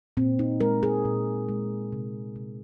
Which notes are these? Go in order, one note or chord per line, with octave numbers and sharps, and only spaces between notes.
A#2 C4
D#4
G#3 A#4
G#4
A#2
G#3
C3
C3